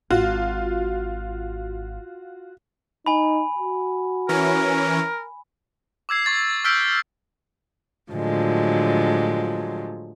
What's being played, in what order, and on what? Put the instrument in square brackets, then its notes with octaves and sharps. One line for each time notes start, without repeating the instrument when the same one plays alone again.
[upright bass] G#1 [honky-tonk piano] F4 [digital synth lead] F#4
[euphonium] D#4 [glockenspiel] G#5 B5
[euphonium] F#4
[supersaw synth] E3 C#4 [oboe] A#4
[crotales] D6 E6 G#6 C7
C#6 A6
E6 F6 G6 B6 D7
[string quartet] A2 D3 F3 F#3 G#3